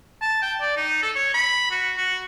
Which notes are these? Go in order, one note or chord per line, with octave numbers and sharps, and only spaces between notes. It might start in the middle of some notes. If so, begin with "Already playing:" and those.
A5
G5
D5
D#4
A4
C#5
B5
F#4
F#4